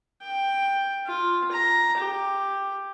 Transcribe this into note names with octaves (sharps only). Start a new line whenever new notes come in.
G5
F4
A#5
G4